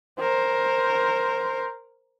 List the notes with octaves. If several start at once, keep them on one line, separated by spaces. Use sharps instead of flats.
A#4 C5